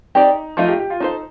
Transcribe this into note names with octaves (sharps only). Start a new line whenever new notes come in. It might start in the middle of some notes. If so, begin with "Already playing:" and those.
C4 D#4 G4 D5
F3 A3 D#4 F4
G4
G4
F4
D4 D#4 A4 C5